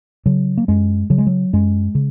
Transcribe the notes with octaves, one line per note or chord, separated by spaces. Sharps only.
C#3 F#3
A#3
F#2 G#3
C#3 F#3
G#3
F#3
F#2 G#3
C#3